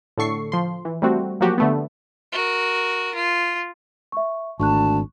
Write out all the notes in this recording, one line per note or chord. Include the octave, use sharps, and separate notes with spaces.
A2 D3 A4 C#6 C7
F3 C6
E3
G3 A3 C4 F#4
F3 F#3 A#3 F#4 G4
D3 A3 B3
F#4 A#4
F4
E5 C#6
G#1 D2 A5 C#6 F#6